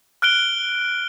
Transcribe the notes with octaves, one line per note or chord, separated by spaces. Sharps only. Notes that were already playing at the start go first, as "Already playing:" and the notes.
F6 F#6 D7 G7